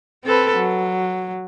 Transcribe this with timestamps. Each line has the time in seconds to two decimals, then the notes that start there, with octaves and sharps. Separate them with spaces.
0.24 C4 A4 B4
0.57 F#3